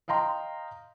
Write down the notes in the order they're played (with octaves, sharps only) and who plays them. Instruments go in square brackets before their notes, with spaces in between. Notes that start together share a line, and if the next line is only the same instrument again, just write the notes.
[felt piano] D#5 F5 G5 A#5 C6